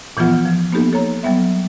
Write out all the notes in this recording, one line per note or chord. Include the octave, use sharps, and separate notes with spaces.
A#2 E3 F3 B3 F4 F#5
F3
A#3 B3 D#4 G4 A4
A4 C#5 A#5
F#3 G3 B3 E5